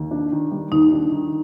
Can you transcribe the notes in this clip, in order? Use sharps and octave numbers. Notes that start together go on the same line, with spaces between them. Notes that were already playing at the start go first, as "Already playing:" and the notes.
Already playing: D#2
D4
D#3
G3
D#2 D#4
D4
D#3